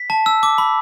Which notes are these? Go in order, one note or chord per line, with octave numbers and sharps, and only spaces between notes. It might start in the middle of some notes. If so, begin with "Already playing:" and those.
Already playing: B6
A5
E6
D6
B5